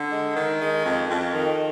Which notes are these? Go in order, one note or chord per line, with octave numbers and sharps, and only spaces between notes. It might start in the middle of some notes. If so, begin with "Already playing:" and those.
Already playing: D3
G#3
D#3
G#3
F2
F2
D#3